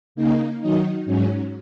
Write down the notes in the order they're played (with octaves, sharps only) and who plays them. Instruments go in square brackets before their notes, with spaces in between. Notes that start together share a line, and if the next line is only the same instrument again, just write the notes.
[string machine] C#3 A#3 D#4
D#3 F#3 D#4
G#2 F#3 C#4